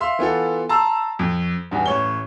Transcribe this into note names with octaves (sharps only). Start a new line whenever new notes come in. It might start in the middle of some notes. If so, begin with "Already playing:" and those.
E5 F5 C6
E3 B3 F4 A4
A5 A#5 C6 E6
F2
E2 G2
A1 C#5 G7